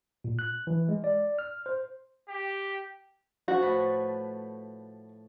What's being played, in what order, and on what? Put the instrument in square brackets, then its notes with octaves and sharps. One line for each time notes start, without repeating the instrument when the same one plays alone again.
[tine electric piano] A#2
F#6
E3
G#3
D5
F6
C5
[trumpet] G4
[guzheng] F3 [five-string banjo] F#4
[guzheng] A2 A3 B4